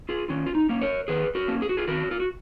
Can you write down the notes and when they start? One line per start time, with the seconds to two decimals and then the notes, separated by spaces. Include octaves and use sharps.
0.09 F4 G#4
0.29 D#3 C#4 F4
0.47 F4
0.55 D#4
0.69 A#3 C#4
0.81 A#4 C#5
1.08 D#3 G#4 B4
1.35 F#4 A#4
1.48 A#3 C#4
1.62 G#4
1.69 F#4
1.77 F4 G#4
1.88 D#3 F#4 A#4
2.11 F4
2.20 F#4